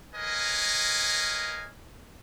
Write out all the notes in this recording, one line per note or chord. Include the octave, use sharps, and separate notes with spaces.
A#4 B4 C#5 D#5 F5 G#5